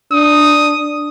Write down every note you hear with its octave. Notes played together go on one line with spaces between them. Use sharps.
D4 D#6